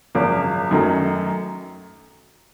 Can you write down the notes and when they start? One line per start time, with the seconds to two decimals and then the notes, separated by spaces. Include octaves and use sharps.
0.15 G#1 F#2 C#3 F3 A#3
0.71 F#2 D#3 F#3 A3 C#4